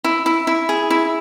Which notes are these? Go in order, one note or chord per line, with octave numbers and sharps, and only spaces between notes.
E4
E4
E4
G#4
E4